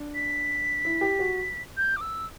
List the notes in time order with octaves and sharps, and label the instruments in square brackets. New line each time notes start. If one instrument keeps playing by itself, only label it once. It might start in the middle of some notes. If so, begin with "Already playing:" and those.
Already playing: [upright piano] D4
[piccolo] B6
[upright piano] E4
G4
F#4
[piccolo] G6
D6
E6